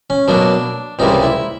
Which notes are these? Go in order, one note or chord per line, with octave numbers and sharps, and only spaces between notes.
C#4
B2 F#3 A#3 D4
C#2 C3 E3 G3 A#3 D#4
E4